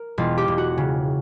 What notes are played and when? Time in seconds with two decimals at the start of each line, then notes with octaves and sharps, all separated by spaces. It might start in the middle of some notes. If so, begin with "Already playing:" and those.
Already playing: A#4
0.18 E1 F4
0.37 G4
0.48 E1
0.58 F#4
0.78 C#3